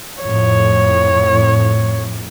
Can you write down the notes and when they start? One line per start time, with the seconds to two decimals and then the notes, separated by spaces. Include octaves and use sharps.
0.22 F2 A2 C#5